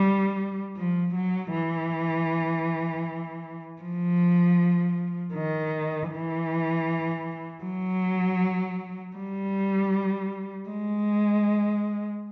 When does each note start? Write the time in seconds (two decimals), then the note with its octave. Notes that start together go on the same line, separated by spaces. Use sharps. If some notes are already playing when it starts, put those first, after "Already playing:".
Already playing: G3
0.77 F3
1.15 F#3
1.53 E3
3.82 F3
5.34 D#3
6.11 E3
7.64 F#3
9.16 G3
10.69 G#3